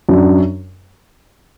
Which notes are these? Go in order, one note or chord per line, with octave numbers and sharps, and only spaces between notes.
F#2 F#3 D4